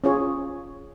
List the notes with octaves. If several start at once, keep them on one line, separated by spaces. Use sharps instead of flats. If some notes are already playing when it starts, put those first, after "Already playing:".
C#4 F4 G#4 C#5